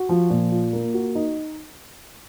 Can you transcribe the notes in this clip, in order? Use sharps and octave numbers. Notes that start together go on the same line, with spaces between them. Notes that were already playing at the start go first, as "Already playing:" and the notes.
Already playing: F#4
F3
A#2
F4
A#3
F#4
D#4